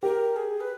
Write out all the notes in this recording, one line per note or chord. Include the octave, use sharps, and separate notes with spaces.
G4 A#4
G#4
B4